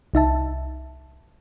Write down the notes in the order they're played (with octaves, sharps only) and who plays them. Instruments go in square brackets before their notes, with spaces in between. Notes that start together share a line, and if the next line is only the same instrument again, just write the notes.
[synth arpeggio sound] C2 D#4 E5 A5